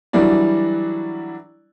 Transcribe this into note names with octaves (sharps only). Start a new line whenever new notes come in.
E3 F#3 G3 D4 E4 D5